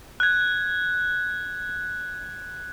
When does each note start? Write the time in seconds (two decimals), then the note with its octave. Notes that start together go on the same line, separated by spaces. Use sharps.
0.20 F#6 G#6